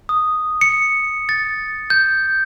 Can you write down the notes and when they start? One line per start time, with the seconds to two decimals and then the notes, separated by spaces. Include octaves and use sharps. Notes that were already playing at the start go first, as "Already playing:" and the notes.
0.09 D#6
0.61 C#7
1.29 A6
1.90 G6